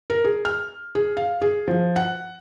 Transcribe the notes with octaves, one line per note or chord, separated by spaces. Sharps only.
A#4
G#4
F6
G#4
F5
G#4
F3
F#5